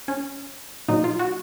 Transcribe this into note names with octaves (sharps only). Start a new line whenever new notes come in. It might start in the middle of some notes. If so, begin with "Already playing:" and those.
C#4
A#2 F#3 D#4
F4
F#4